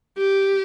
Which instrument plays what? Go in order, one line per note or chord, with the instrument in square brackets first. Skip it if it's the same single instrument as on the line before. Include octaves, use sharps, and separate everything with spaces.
[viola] G4